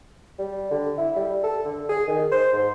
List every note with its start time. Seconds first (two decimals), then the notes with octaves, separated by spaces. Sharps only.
0.38 G3
0.71 D3
0.98 E4
1.16 G3
1.43 A4
1.65 D3
1.89 G#4
2.08 D#3
2.32 C5
2.53 G#2